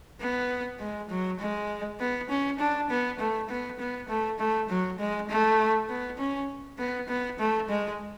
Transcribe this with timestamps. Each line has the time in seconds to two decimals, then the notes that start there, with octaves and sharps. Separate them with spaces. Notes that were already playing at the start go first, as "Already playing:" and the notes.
0.21 B3
0.80 G#3
1.10 F#3
1.40 G#3
2.00 B3
2.29 C#4
2.60 D4
2.90 B3
3.20 A3
3.49 B3
3.79 B3
4.09 A3
4.39 A3
4.69 F#3
4.99 G#3
5.29 A3
5.89 B3
6.18 C#4
6.79 B3
7.08 B3
7.39 A3
7.69 G#3